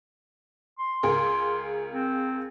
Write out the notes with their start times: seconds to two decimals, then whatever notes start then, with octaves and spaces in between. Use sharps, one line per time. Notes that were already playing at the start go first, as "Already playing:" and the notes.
0.79 C6
1.03 C#2 G#4 A#4
1.91 C4